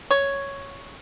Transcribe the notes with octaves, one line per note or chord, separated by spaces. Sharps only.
C#5